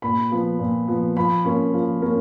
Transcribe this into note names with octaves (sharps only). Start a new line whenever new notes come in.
A#2 B5
F3 B3
A#2
F3 B3
F3 B5
A#3 C#4
F3
A#3 C#4